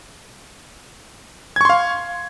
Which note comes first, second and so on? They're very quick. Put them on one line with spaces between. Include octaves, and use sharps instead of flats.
G#6 C#6 C6 F5